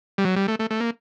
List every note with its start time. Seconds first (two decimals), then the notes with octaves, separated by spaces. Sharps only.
0.18 G3
0.25 F#3
0.36 G3
0.48 A3
0.59 A3
0.70 A3
0.81 A#3